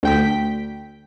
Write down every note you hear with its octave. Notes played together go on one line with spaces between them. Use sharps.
D2 G5 B6